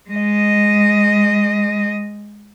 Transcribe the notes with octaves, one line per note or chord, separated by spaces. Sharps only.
G#3 D#5